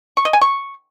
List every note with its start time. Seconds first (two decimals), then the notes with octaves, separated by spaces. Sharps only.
0.17 C#6
0.25 D#5
0.33 G#5
0.41 C#6